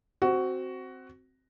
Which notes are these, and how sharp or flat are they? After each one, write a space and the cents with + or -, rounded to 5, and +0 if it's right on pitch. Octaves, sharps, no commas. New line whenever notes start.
C4 +0 F#4 +10